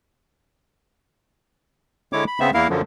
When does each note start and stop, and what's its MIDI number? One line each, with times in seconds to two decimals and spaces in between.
2.13 2.24 50
2.13 2.24 56
2.13 2.24 64
2.13 2.24 73
2.13 2.24 86
2.27 2.40 83
2.40 2.51 49
2.40 2.51 59
2.40 2.51 60
2.40 2.51 76
2.54 2.68 40
2.54 2.68 58
2.54 2.68 64
2.54 2.68 70
2.54 2.68 77
2.70 2.82 42
2.70 2.82 50
2.70 2.82 53
2.70 2.82 54